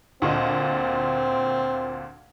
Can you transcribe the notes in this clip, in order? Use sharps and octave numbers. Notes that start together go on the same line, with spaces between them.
D2 A#2 C4 D#5